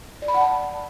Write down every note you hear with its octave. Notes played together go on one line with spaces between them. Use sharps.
D5
B5
F#5
A5